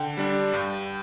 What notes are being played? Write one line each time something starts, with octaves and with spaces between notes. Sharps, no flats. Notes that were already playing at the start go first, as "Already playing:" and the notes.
Already playing: D3 G5
G3 D4
G2